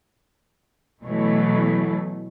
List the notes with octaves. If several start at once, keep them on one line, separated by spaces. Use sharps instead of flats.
B2 E3 F#3 A3